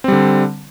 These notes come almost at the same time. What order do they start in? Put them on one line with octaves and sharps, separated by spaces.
C4 G3 D3